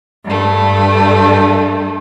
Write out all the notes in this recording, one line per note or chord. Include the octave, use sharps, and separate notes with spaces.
G2 A3